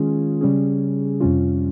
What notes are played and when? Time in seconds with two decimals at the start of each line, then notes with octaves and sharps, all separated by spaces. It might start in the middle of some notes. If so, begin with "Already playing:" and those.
Already playing: D#3 G#3 C#4 F4 G#4
0.41 C#3 G3 C#4 G#4
1.20 F2 C3 G3 C#4 F4